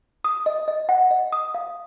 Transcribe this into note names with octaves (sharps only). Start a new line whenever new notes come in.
D#6
D#5
D#5
F#5
D#5
D#6
F5